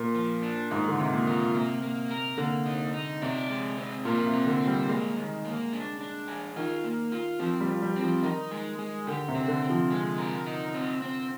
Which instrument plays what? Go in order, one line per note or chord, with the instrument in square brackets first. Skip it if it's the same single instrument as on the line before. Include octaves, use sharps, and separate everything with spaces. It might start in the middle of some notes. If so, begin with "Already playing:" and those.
Already playing: [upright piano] A#2
[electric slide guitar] F3
D4
[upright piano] G#2 [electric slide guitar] D#3
[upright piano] D3
[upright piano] C3 [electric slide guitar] D#3
[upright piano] A#2
[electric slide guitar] F4
[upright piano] C3 [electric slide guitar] A#3
[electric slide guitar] A#3
A#4
[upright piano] D3 [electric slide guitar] A#3
[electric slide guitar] D#4
D#4
[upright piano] C3 [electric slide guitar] D5
[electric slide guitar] G#3
C4
[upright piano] A#2 [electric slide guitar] F4
[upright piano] C3
[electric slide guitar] C4
[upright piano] D3
[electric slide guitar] C5
[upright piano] G3
[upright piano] G#3 [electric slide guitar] A#3
[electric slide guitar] D#3
A#3
D4
D4
G#4
[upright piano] D#3 [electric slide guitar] F4
[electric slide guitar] A#3
F4
[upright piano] F3 [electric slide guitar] C4
[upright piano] G3
[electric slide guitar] F3
[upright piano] G3
[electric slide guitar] C4
[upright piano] F3
[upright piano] D#3 [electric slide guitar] D#4
[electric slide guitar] G#3
G#3
[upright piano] D3 [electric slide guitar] G4
[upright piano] C3
[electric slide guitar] C4
[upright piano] D3
[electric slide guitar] C4
[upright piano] F3
[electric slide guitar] G#3
A#4
D#4
C4
C4